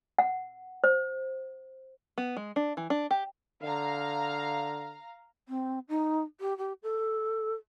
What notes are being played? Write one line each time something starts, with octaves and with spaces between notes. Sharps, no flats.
F#5
C5
B3
G#3
D4
E3
D4
G4
D3 F5 A#5
C4
D#4
G4
G4
A4